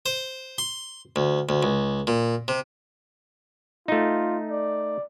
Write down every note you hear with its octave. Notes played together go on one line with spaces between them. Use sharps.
C5
C6
D2
D2
C#2
A#2
C3
A3 D#4 F4
D5